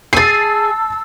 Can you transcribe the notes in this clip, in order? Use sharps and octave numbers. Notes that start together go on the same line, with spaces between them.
G#4 G#5 A5 E6 A6 C7